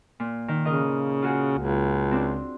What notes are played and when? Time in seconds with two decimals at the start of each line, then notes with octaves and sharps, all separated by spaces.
0.20 A#2
0.48 D#3
0.65 C#3 F4 A#4 D#5
1.22 F4 F#4 G#4
1.59 C#2
2.11 C4 D4